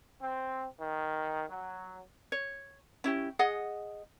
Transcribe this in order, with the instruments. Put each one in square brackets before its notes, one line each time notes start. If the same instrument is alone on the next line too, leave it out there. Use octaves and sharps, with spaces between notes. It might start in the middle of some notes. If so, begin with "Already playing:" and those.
[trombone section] C4
D#3
F#3
[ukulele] C#5
C#4 E4 G4
G#4 D#5 F#5